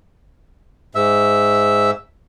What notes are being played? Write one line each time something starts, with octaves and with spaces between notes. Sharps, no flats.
G#2 E5